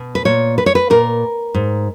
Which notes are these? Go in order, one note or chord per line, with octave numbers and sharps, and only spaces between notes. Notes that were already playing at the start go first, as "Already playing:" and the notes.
Already playing: B2
B4
A#2 C#5
B4
C#5
B4
A#2 A#4
G#2